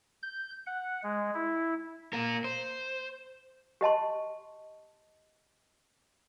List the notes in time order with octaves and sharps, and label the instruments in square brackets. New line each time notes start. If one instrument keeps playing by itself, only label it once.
[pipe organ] G6
F#5
G#3
E4
[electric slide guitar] A#2 A#3 A#4
C5
[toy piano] G4 D#5 A5 C6